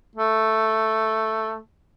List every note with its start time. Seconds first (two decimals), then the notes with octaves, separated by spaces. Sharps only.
0.16 A3